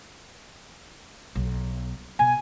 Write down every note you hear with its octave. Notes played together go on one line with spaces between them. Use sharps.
B1
B2 G#5